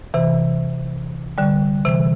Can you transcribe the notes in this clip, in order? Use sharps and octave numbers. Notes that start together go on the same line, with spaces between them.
C3 E3
D3 G3
C3 E3